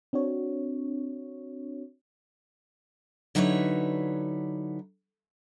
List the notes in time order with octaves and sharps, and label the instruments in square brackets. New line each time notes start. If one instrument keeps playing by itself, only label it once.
[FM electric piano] C4 D4 F#4 C#5
[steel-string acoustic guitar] D3 F#3 D#4 E4 B4 C#5